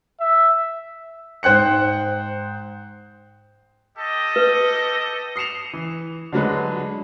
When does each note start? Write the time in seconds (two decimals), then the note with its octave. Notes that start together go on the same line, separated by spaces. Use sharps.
0.20 E5
1.43 G#2 C5 G5 F#6 C#7
3.97 G4 A4 D#5
4.36 B4
5.36 D#6 C7 C#7 E7 F7
5.73 E3
6.32 D3 F#3 G#3 B4